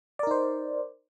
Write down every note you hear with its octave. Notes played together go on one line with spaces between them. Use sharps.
D#4 A#4 C5 D5